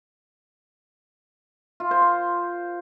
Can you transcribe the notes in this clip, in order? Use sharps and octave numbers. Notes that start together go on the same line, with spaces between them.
F4
C5
C5